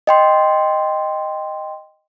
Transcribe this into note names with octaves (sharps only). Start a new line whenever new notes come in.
D#5 G5 C6